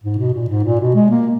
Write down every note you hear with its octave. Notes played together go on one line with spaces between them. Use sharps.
G#2
B2
A#2
G#2
A#2
B2
G#3
A#3